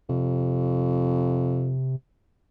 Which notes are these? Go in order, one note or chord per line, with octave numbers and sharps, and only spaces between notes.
F2 C3